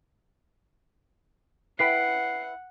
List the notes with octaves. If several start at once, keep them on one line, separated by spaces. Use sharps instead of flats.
E4 B4 F#5 G5 C7